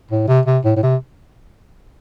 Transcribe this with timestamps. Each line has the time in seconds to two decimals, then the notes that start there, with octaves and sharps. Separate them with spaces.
0.11 A2
0.28 C3
0.46 C3
0.64 A2
0.76 A2
0.83 C3